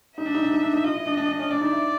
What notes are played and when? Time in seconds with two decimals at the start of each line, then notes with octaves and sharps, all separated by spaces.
0.18 D#4 E5
0.26 D4
0.34 D#4
0.43 D4
0.51 D#4
0.62 D4
0.73 D#4
0.84 F4 D#5
0.95 E4
1.06 D4
1.17 D4
1.29 D4
1.39 C#4
1.50 D4 D5
1.61 D#4
1.73 E4